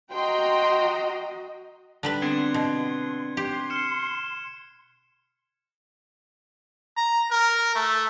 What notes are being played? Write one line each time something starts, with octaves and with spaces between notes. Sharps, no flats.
F#4 D#5 G5 A#5 C6
D3 G3 B4 F#6
B3 C4 D4 C6 G#6
B2
G4 C6
F6 C#7 E7
A#5
A#4
A3